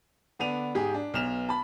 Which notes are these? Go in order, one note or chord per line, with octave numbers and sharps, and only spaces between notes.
D3 B3 D4 D#7 F7
G#2 G4 G#4
D4
B1 F6 E7 F7
A5 B5